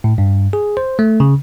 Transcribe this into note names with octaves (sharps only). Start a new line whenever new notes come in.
A2
G2
G#4
C5
A3
C#3